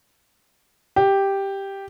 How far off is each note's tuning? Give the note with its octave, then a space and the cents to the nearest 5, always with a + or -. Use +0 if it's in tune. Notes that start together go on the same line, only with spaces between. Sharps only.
G4 +0